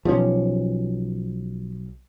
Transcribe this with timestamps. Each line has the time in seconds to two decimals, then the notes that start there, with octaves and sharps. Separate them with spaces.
0.05 B1 F3 G3 C#4